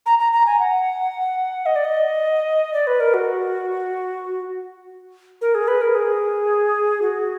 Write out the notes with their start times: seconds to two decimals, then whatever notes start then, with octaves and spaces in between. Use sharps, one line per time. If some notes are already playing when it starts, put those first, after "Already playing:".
0.06 A#5
0.19 A#5
0.33 A#5
0.46 G#5
0.59 F#5
1.66 D#5
1.76 D5
1.85 D#5
2.74 D5
2.87 B4
3.00 A#4
3.14 F#4
5.41 A#4
5.55 G#4
5.68 B4
5.81 A#4
5.95 G#4
7.02 F#4